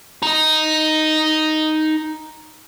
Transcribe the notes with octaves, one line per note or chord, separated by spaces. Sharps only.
D#4 D#5